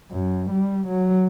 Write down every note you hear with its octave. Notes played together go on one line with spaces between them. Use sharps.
F#2
G3
F#3